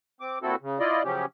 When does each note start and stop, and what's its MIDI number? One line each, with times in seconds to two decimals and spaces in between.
0.21 0.39 60
0.21 0.39 86
0.42 0.55 46
0.42 0.55 60
0.42 0.55 64
0.42 0.55 66
0.42 0.55 69
0.62 0.79 49
0.80 1.03 64
0.80 1.03 65
0.80 1.03 74
0.80 1.03 75
1.04 1.25 49
1.04 1.25 53
1.04 1.25 54
1.04 1.25 61
1.04 1.25 67